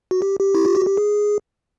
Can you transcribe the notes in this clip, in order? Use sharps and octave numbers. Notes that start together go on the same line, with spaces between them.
F#4
G4
G4
E4
F4
F#4
G4
G#4